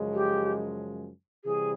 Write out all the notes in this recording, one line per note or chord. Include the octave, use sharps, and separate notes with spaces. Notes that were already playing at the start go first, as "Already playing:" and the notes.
Already playing: F#2 C#3 F3 G#3
G4
C3 E3 G3 G#4